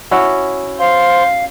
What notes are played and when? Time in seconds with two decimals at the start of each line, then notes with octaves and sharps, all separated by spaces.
0.11 C#4 E4 F#4
0.79 C5 F5 C6